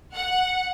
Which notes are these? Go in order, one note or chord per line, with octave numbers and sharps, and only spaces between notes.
F#5